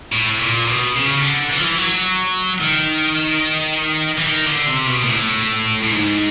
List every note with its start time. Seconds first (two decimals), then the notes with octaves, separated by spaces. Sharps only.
0.12 A2
0.40 A#2
0.68 B2
0.95 C#3
1.22 D3
1.51 E3
1.58 F3
1.64 E3
1.78 F#3
2.61 D#3
4.18 E3
4.26 D#3
4.46 D3
4.67 C3
4.87 B2
5.04 A#2
5.09 A2
5.83 A2
5.91 G#2